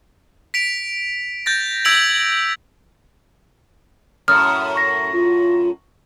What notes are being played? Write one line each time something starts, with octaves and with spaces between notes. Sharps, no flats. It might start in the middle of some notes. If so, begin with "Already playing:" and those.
B6 D7 F7
G6 A6 A#6
E6 G#6 B6 D7 F7 F#7
F#2 A2 D#6 F6
C#6 A#6
F4